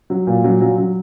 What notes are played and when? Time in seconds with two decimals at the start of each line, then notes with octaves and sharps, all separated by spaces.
0.10 F#3
0.27 A#2
0.44 F#3
0.61 F#3
0.78 F#3